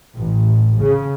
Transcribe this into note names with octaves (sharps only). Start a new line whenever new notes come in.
A1
C#3